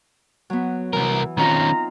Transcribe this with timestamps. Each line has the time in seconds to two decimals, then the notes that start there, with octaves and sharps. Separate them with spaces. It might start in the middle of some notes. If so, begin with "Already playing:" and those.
0.50 F#3 B3
0.93 C2 E3 A#4
1.37 D#3 C4 C#4 D#4 F4 A#5